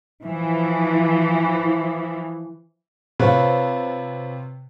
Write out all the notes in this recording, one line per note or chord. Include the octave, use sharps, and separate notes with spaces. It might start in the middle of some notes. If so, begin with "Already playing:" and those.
E3 F3
C3 F4 B4 C#5